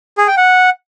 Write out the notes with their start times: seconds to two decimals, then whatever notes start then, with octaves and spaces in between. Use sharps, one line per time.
0.18 G#4
0.28 G5
0.37 F#5